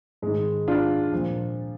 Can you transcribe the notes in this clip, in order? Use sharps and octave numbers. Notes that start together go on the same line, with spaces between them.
G#2 D#3 G#3
D4 F4
A#2 F3